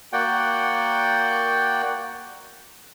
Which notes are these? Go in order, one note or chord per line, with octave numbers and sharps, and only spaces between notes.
A#3 F#4 D5 F#5 G5